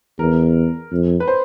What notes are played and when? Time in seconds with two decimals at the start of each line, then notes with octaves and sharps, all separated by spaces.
0.19 E2 A#4
0.92 F2
1.20 B4
1.28 C5